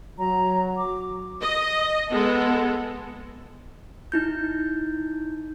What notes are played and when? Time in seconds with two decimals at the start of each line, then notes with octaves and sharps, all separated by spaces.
0.19 F#3 A#5
0.77 D6
1.42 D#5
2.11 G#3 B3 A4
4.12 D#4 E4 G6